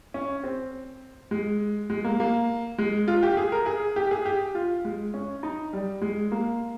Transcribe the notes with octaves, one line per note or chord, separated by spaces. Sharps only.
C#4
C4
G#3
G#3
A#3
A#3
G#3
F4
G4
G#4
A#4
G#4
G4
G#4
G4
F4
G#3
C#4
D#4
G3
G#3
A#3